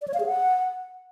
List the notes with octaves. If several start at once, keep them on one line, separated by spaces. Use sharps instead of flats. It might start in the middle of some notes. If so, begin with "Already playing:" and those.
D5
C#5
F5
G#4
F#5